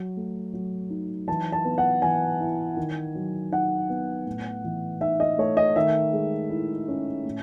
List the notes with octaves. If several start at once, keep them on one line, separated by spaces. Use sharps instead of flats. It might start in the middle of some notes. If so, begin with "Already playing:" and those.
Already playing: F#3
A3
F#3
D#4
E3 A5
A5
B3
F#5
E3 G#5
E4
D#3
F#3
D#4 F#5
B3
A2
E3
D#4 E5
D#5
A3 C#5
D#5
D#3 E5
G#3
E4
C#4
A2